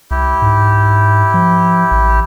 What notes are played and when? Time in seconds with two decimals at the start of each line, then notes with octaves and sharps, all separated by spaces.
0.11 C2 E4 G4
0.42 G#2
1.34 F3
1.91 A1